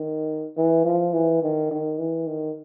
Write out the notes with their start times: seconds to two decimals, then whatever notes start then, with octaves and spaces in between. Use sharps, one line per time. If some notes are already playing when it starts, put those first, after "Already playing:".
Already playing: D#3
0.57 E3
0.85 F3
1.13 E3
1.43 D#3
1.71 D#3
1.98 E3
2.27 D#3